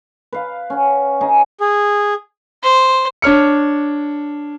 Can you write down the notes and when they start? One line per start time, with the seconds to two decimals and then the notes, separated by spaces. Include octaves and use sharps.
0.33 B4 F5
0.70 C#4 F#5
1.21 C#4 D#4 G#4
1.60 G#4
2.63 C5
3.22 D4 C#5 F6 C#7